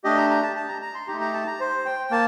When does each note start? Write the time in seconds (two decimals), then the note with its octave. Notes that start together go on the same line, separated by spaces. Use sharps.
0.04 A3 D4 G4 D#5
0.17 A#5
0.30 A#5
0.43 A5
0.56 A5
0.68 A#5
0.82 A#5
0.94 C6
1.08 A3 D#4 G4 A#5
1.21 A#5
1.33 A5
1.47 A#5
1.60 C5
1.85 G5
2.11 A#3 A5